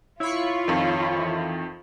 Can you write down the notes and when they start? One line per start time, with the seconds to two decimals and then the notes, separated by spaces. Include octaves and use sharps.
0.20 E4 F4 C#5 B5 C#6
0.68 F2 D#3
1.18 E3